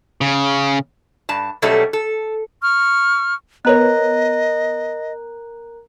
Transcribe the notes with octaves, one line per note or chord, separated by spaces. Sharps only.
C#3
G2 A5
B2 F#3 G3 A3 C#4 A4
A4
C#6 F6
B3 A#4 B4 C#5 D#5 A#5 F#6